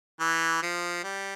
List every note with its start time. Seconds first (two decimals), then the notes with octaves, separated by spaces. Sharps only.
0.20 E3
0.62 F3
1.03 G3